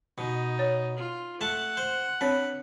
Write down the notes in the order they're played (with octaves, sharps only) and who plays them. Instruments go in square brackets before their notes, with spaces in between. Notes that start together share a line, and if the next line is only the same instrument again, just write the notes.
[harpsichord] B2 [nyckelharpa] D#4
[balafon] C#5
[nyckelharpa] F4
[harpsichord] A3 A5 [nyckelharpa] F#5
[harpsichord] C5
[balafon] C4 D4 C#5 [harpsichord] B4